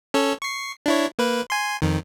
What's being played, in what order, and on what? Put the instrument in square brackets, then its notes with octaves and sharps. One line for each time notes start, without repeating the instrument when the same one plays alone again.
[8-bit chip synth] C#4 A4 C#5
C#6 C7
D4 E4 C#5
A#3 B4
G#5 C6
F2 D#3